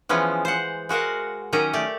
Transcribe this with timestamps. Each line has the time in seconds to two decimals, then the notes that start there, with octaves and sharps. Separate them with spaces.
0.09 E3 F3 G#3 B3 C#4
0.45 C5 F#5
0.89 G#3 F#4 A#4 F5 F#5
1.53 D#3 F#3 C#4 G4 D#5 A#5
1.73 A3 G4 D5